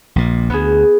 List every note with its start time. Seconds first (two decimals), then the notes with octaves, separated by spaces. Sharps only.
0.16 A#1 A#2
0.50 D2 B3 G#4